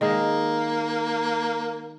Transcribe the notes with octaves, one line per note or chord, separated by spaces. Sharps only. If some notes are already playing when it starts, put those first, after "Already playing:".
D#3 G#3 A#3 G#4